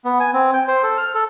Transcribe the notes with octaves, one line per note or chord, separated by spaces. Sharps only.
B3
G#5
C4
G5
C5
A4
F6
A4